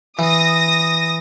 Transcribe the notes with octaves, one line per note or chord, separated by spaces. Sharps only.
E3 D#6 A#6